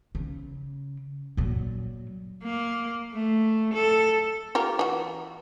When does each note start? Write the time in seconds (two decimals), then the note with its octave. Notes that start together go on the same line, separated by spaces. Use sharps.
0.15 C#3
1.37 A#2 F#3
2.43 A#3
3.13 A3
3.74 A4
4.55 F4 G4 A#4
4.79 E3 F#4